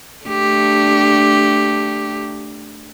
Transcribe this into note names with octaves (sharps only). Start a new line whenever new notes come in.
A3 D4 G4